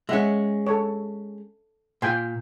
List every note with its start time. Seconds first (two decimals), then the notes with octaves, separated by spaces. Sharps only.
0.09 G#3 C#4 E5 F#5
0.67 A4 C#5
2.02 A#2 G5 G#5 C6